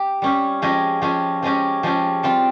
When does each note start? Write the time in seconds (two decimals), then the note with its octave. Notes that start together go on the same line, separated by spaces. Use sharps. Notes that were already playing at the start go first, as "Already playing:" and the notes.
Already playing: G4
0.22 G3 C#4 G4
0.62 F3 G#3 C#4 G4
1.02 F3 G#3 C#4 G4
1.42 F3 G#3 C#4 G4
1.83 F3 G#3 C#4 G4
2.23 G3 C4 F4